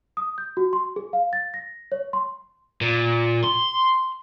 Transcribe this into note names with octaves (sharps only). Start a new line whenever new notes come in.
D#6
G6
F#4
C6
G#4
F5
A6
A#6
C#5
C6
A#2
C6